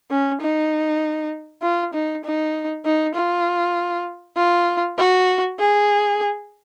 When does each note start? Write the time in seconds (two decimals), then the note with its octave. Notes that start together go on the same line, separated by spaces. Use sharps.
0.11 C#4
0.41 D#4
1.62 F4
1.94 D#4
2.24 D#4
2.85 D#4
3.14 F4
4.36 F4
4.98 F#4
5.59 G#4